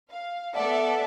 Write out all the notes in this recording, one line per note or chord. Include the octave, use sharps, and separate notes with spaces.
F5
B3 A4 D5 E5 F#5